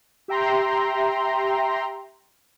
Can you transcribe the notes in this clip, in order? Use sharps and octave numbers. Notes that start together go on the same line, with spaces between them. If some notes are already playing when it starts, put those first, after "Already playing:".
G4 E5 G5 A#5 C6